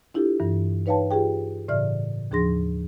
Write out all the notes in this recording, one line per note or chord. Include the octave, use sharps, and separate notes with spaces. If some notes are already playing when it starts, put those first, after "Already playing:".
D4 E4 F4 G4 A4
G2 E3
D#4 B4 C#5 F5 G5 A5
F4 G4 G#4 G5
A2 C#3 E3 D5 E5 F6
D#2 F3 D4 G#4 C6 A#6